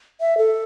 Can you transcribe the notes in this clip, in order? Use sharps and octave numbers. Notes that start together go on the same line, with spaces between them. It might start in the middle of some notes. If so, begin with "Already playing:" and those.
E5
A4